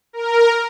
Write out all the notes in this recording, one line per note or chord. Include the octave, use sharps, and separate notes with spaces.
A#4